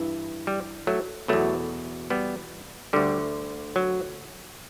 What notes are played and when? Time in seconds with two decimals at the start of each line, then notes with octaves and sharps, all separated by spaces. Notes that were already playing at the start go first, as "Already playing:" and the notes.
Already playing: G2 E3
0.47 G3
0.87 F#3 A3
1.28 E2 B2 F#3 A3
2.10 G3 B3
2.93 D2 D3 G3
3.76 F#3